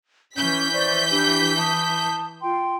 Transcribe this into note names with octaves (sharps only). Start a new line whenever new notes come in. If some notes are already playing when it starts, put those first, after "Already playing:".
E3 C#4 G6 B6
C5 D5 C#6
D4 G4
A5 D#6
F4 G5 C6